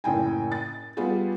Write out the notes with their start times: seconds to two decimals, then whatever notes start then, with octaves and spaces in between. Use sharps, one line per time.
0.04 F#1 A2 G5 G#5
0.52 A6
0.97 G3 B3 F4 G4 G#4